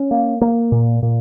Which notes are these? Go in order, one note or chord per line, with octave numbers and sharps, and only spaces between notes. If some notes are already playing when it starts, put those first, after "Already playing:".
Already playing: C#4
A#3
A#3
A#2
A#2